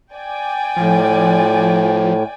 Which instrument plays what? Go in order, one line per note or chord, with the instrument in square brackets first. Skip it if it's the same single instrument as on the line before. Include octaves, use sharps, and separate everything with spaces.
[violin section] D5 G5 G#5
[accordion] A2 [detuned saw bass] F3